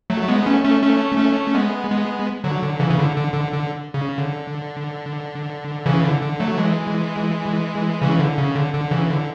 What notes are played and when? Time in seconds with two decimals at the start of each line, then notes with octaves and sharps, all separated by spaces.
0.10 F#3 A3
0.23 A3
0.28 G#3 B3
0.46 A3 C#4
0.64 A3 C#4
0.82 A3 C#4
1.18 A3 C#4
1.55 G#3 B3
1.90 G#3 B3
2.44 D3 F#3
2.63 D3
2.79 C#3 E3
2.90 C#3
2.98 D3
3.17 D3
3.33 D3
3.52 D3
3.94 C#3
4.18 D3
5.86 C#3 E3
6.04 D3
6.22 D3
6.40 F#3 A3
6.58 E3 G#3
8.02 C#3 E3
8.19 D3
8.37 C#3
8.56 D3
8.74 D3
8.91 C#3 E3
9.10 D3